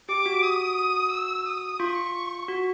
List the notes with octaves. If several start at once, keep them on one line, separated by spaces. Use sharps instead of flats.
G4 D6
F#4
D#6
E6
D#6
F4 C#6
F#4